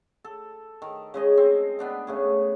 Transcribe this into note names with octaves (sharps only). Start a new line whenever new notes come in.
A4
D#3
C#3 G#3 D#5
C4
B3 D4 G5
C#3 A3 G#4